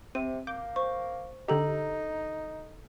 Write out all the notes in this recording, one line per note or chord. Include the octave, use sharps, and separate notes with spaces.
C3 C4 D#7
A#3 D6 G6
C5 C#6
D3 D#4 G4 A4 A#5